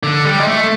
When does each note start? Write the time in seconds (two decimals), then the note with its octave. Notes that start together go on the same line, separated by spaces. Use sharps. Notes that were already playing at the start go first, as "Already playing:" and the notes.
0.03 D3
0.25 G3
0.39 G#3
0.47 A3